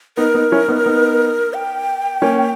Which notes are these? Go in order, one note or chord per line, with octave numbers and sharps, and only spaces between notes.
B3 D#4 A#4
B3 D#4
C#4 E4
B3 D#4
B3 D#4
G5
A#3 C#4